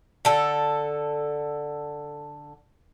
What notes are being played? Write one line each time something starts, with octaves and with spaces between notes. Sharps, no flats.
D3 A4